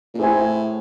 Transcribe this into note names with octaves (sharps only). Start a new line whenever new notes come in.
A#2
A2 E4 G#4 C5 E5 G#5